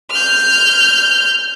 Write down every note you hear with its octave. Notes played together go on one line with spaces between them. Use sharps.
F6 G6